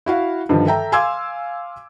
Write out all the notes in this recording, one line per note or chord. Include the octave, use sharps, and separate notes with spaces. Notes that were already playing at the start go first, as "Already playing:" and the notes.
E4 F#4 F5
G2 D3 D#3 F3
A4 E5 G5 A#5
F5 G#5 C6 D6 E6 G#6